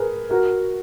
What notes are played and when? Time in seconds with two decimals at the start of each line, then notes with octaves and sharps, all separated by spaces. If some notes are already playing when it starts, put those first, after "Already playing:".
Already playing: G#4 A#4 B4
0.30 F#4 A#4